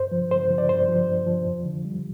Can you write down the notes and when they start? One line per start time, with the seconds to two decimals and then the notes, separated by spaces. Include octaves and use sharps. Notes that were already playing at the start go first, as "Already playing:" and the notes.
Already playing: G2 C5
0.12 F3
0.31 G2 C5
0.50 F3
0.58 D5
0.69 G2 C5
0.88 F3
1.09 G2
1.27 F3
1.46 F2
1.66 D3
1.85 G3